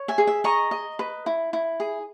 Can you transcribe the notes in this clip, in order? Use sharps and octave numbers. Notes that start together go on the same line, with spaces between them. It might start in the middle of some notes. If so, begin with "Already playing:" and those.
Already playing: C#5
E5 G#5
G#4
E5
D#5 A#5 C#6
D#5
B4
E4
E4
G#4